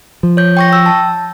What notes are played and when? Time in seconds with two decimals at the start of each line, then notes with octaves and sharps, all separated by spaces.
0.23 F3
0.37 C#5 G6
0.57 G5 C#6 A#6
0.69 G5 E6
0.86 A5